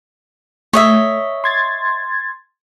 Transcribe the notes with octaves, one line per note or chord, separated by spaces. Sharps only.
A3 C#5 D#5 E5
C6 G#6 A6